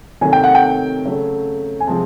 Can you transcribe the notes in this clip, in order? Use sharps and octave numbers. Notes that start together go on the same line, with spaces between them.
C3 D#3 F#3 A3 G#5
G5
F#5
G5
C#3 F#3 A3
G#5
C3 F3 G#3 C4 A5